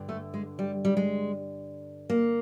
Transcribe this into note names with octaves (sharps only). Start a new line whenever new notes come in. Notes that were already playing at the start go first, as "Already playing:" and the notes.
Already playing: G2 D3
A3
G#3
G3
G3
G#3
A#3